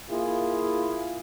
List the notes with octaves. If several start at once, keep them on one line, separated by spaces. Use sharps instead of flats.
A#3 E4 F4 G#4